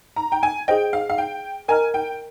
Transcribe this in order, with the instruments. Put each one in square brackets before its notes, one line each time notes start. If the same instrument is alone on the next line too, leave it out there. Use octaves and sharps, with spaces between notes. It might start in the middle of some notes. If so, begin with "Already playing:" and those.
[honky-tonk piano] A#5
G5
G#5
[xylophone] G#4 C5 D#5 [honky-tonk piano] G5
[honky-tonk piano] F5
F5
G5
[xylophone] A#4 D#5 A#5 F6 [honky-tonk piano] G#5
[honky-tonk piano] G5